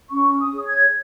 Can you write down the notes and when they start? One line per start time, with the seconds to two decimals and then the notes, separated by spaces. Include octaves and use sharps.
0.10 C#4 C#6
0.39 D#6
0.53 G#4 C#5
0.66 G#6